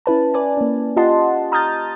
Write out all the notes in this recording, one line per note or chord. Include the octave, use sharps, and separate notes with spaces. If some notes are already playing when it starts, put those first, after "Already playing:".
C#4 E4 B4 A5
B4 D5 G#5
A#3 C#4
F4 G4 D#5 F#5 A5 C6
A#5 D#6 F6 G6 A6